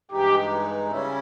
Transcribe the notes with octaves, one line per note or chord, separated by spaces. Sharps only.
G2 E3 G#3 D#4 G4
C#3 G3 C#4 E4